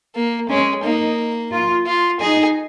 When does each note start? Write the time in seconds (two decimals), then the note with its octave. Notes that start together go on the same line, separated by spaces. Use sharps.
0.15 A#3
0.49 G#3 C#4
0.83 A#3 D#4
1.52 F4
1.86 F4
2.20 D#4 G#4